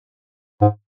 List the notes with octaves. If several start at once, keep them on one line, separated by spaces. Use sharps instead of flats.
G#2